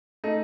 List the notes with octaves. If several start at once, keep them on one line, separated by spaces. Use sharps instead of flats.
A3 D#4